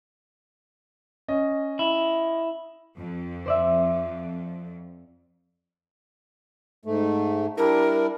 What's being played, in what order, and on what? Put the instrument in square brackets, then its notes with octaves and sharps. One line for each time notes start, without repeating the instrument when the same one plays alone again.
[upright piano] C#4 D#5
[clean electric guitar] E4
[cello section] F2
[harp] C5 D5 E5
[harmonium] G#2 A3
[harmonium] G3 D4 E4 [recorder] A#4